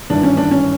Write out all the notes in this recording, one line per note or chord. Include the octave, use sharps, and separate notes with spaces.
G#1 G2 E3 D4
C#4
D4
C#4